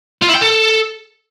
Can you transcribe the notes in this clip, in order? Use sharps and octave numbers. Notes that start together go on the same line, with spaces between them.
F4
E4
G5
A4